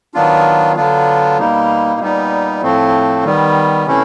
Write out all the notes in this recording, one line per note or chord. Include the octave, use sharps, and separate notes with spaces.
D#3 F#3 B3 D4 F4
D3 F#3 B3 D4 F4
B2 G3 A#3 D#4
A#2 G3 B3 D#4
A2 F3 A3 C4
D#3 G3 B3
C3 E3 A3 C#4 E4